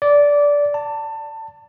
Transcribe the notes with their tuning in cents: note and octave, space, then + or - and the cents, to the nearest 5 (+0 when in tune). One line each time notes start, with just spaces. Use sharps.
D5 -15
A5 +20